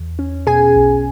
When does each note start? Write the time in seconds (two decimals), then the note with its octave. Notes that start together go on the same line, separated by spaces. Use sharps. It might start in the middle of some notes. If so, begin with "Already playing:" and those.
Already playing: E2
0.19 C#4
0.47 B2 G#4 G#5
0.76 B1